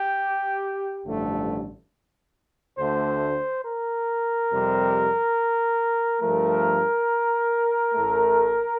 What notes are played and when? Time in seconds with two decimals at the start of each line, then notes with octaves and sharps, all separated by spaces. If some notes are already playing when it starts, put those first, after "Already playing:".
Already playing: G4
1.05 A1 G2 D3 F3 A3
2.77 D2 D3 A3 C5
3.64 A#4
4.49 F2 C3 G3
6.21 G2 F3 A3 A#4
7.93 A1 A2 A3